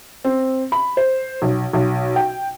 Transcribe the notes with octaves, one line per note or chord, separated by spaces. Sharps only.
C4
B5
C5
B1
B1
G5